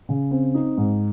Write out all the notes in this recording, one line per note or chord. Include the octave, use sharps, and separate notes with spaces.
C#3
C4
D#4
G#2